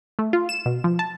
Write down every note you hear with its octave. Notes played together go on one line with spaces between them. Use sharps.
A3
F4
E7
B2
F3
A5